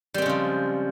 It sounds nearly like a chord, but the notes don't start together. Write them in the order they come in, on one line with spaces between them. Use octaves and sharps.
G3 C4 G#3 C#3 F3